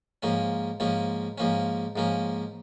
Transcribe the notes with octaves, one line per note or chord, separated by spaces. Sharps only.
G#2 F3 A#3 C#4
G#2 F3 A#3 C#4
G#2 F3 A#3 C#4
G#2 F3 A#3 C#4